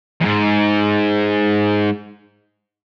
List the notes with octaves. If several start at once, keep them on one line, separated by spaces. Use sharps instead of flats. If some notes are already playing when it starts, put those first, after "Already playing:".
E2 G#2